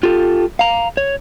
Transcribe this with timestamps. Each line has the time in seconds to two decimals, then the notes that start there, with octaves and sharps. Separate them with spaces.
0.03 F4 G4 A4
0.59 F5 A#5
0.97 C#5